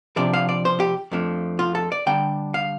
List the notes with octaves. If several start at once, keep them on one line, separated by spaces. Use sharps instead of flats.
C3 F3 D4 D5
F5
D5
C5
G4
F2 F3 A3 D4
F4
A4
D5
D3 G3 D4 G5
F5